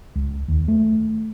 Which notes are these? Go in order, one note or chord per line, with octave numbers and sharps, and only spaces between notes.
C#2
D#2
A3